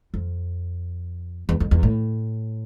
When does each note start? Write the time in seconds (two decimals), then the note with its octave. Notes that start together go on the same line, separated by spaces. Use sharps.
0.14 F2
1.49 E2
1.60 F2
1.71 E2
1.83 A2